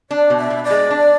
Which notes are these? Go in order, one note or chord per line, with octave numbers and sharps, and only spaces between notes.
D4 D5
B2
E5
B2
D5
G#3
D4